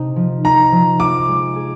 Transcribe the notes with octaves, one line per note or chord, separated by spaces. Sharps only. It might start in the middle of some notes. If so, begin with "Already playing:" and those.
Already playing: C3 C4 D#4
F3
D#4 A#5
F3
F4 D6
G#3
G#4